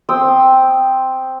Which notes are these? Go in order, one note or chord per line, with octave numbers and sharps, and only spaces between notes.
C4 G5 D#6 E6